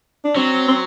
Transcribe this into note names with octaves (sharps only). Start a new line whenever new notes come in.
D4
F#3 C4
C4